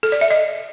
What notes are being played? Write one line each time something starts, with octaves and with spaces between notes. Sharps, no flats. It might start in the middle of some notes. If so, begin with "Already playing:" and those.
A4
D5
E5
D#5